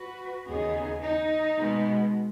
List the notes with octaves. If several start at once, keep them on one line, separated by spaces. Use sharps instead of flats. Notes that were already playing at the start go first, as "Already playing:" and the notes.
Already playing: F#4 B4
D#2 C#3 B3 D#4 G#4
D#4
B2 G#3 B3